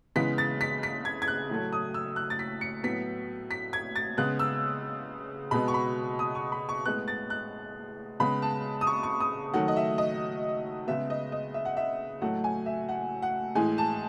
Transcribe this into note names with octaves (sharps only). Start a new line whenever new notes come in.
C#3 E3 G#3 B3 B6
A6
B6
B6
G#6
G#6
F#6
A2 F#3 A3
D#6
E6
F#6
A6
B6
C#7
A2 F#3 B3 B6
B6
G#6
A6
C#3 G#3 B3 F#6
E6
B2 G#3 B3 B5
C#6
B5
D#6
C#6
B5
C#6
A2 G#3 B3 F#6
A6
F#6
C#3 G#3 B3 B5
A5
D#6
C#6
C#6
D#6
D#3 F#3 A3 F#5
D#5
E5
D#5
C#3 G#3 B3 E5
D#5
D#5
E5
F#5
E5
A2 F#3 A3 F#5
G#5
E5
F#5
F#5
A2 E3 G#3 G#5
A5